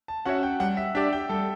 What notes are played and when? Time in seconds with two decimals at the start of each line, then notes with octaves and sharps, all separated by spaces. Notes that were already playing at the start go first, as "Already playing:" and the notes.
0.08 A5
0.25 C#4 F#4 C#5 E5 F#5
0.43 G5
0.60 G3 F#5
0.77 E5
0.95 D4 G4 D5 E5
1.13 G5
1.29 G3 A4